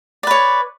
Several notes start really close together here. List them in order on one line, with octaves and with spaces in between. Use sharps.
D5 B4 C#5